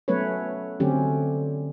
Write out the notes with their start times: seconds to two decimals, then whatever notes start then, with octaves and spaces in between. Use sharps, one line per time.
0.08 F#3 A3 B3 C#4 B4 C#5
0.80 D3 F#3 A3 C4 C#4 G4